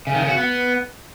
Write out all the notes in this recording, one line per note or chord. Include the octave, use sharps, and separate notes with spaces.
C#3
D#3
C#3
F#4
B3